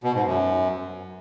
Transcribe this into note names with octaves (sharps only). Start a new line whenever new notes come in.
B2
G#2
F#2